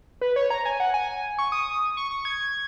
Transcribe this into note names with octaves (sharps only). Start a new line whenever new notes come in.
B4
C#5
A#5
G#5
F#5
G#5
C#6
D#6
C#6
C#6
G#6